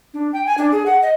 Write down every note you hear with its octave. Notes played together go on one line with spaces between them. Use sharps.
D4
G5
G#5
D4
G#4
F#5
D#5